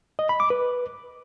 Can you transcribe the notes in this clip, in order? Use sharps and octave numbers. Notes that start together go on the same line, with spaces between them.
D#5
B5
D6
B4